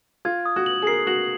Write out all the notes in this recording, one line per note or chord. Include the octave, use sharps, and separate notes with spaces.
F4 G#6
D#6
F#4
F#7
G#4
A#4 C7
F#4 F#7